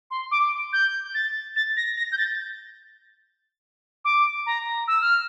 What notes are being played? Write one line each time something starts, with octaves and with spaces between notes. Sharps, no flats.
C6
D6
G6
A6
A6
A#6
A#6
G6
A6
D6
A#5
E6
F6